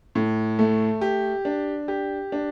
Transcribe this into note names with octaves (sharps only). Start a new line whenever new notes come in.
A2
A3
G4
D4
G4
D4